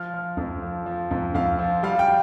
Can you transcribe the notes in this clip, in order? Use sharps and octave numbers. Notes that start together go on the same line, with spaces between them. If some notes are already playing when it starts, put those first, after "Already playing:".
Already playing: F3 F6
F3
F2
F3
F3
F2
F2 F5
F3
G3 F5
G5